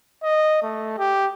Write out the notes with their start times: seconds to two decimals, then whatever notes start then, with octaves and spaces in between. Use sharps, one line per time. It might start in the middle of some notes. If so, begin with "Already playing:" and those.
0.23 D#5
0.63 A3
0.98 G4